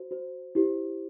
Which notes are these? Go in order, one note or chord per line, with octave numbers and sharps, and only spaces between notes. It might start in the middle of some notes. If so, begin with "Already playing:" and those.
Already playing: F#4 C5
F#4 C5
E4 G4 C5